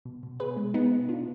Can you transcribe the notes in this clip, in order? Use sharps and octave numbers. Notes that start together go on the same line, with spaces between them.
B2
B2
B2 G#4 B4
G#3
B2 B3 D#4
B3
B2 D4 F4